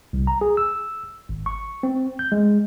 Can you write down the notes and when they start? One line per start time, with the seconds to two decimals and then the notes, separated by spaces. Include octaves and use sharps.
0.13 C2
0.27 A#5
0.41 G#4
0.57 E6
1.29 G#1
1.46 C#6
1.83 C4
2.19 G6
2.32 G#3